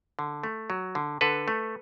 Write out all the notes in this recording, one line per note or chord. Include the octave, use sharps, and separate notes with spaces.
D3
A3
F#3
D3
D3 A4 B4
A3